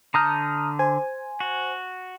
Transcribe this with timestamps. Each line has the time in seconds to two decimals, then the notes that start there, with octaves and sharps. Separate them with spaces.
0.14 D3 A5 A#5 D#6 F6 G6
0.79 C5 G#5
1.40 F#4